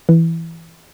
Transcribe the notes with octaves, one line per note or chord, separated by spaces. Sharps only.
E3